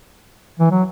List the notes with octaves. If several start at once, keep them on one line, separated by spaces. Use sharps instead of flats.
E3
F#3